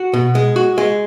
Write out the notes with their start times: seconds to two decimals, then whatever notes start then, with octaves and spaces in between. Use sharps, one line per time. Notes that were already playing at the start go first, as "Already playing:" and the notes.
Already playing: F#4
0.13 B2
0.35 G#3
0.56 F#4
0.78 G#3